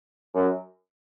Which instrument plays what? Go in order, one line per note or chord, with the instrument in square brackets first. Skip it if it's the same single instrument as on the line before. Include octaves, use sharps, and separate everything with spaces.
[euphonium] F#2